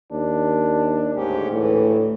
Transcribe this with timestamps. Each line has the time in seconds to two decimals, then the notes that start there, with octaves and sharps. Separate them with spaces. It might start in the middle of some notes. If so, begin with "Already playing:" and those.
0.11 D#2 D4
1.15 D2 G#2 C#4 G4
1.52 D2 A2 E3